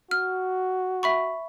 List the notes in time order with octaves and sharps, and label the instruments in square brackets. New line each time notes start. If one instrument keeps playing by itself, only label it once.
[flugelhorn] F#4 [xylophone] F6
[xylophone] E5 B5 C#6